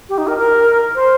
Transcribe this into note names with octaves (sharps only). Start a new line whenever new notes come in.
G4
D#4
A#4
A#4
C5